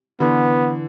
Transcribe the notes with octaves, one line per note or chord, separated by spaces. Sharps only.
D3 E3 B3